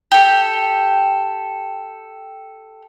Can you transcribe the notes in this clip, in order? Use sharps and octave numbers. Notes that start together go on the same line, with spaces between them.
G4 A4